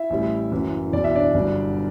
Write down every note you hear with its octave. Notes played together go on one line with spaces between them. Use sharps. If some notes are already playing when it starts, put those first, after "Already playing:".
Already playing: E4 E5
A1 A2 G3
F#1 F#2 E3
F#1 E2 B2 D5
E5
D4 D5
G1 G2 F#3